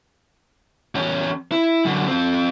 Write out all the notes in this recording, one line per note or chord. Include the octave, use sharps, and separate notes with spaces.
E2 C#4
E4
F#2 D3
C4 F4